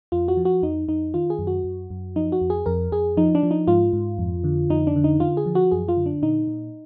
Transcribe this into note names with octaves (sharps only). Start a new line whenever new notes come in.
F2 F4
F#4
F3
F#4
F2 D#4
F2 D#4
D#3 F4
G#4
F#2
F#4
F#2
F#2
F3 D#4
F#4
F2
G#4
F2 A#4
F2 G#4
F3 D#4
D4
F3
D#4
G#2 F4
G#2
F2
D3
F2 D#4
D4
D3
D#4
D3 F4
G#4
F3
F#4
F#2 G#4
F4
D3
D4
A#2 D#4
A#2